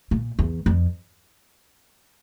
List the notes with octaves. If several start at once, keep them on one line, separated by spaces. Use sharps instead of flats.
A#2
E2
F2